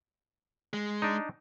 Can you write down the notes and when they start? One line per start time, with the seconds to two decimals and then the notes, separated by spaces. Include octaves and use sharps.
0.73 G#3
1.02 D4 D#4